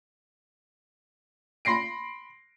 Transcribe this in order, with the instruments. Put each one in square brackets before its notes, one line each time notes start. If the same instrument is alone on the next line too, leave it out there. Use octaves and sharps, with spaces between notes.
[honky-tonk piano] B5 C6 A#6 C7 D7